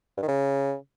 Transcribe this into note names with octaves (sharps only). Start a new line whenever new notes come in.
G2
D#3
C#3